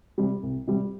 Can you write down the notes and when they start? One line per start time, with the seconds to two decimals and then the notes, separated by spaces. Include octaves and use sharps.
0.18 C3 G3
0.43 C2
0.67 C3 G3